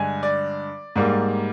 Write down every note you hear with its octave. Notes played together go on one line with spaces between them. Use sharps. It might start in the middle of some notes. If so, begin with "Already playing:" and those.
Already playing: G2 D3 G#3 G#5
D5
G#2 G3 A#3